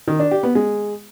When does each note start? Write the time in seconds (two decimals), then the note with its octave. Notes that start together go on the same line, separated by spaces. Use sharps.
0.08 D#3
0.19 D4
0.31 G4
0.43 B3
0.55 G#3